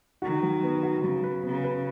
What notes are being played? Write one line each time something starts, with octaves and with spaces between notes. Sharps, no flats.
D#3 F#4
F#3
B3
F#4
C#3 F#3
B4
C#3 B3
B4